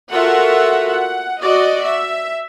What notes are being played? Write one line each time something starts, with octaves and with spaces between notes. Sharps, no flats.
F4 F#4 A4 A#4 E5 F#5
F#5
F#4 D5 D#5
E5